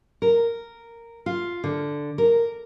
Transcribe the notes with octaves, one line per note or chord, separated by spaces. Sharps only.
A#4
F4
D3
A#4